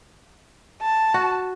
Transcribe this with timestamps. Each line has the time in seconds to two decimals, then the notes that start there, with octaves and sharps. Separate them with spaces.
0.81 A5
1.14 F#4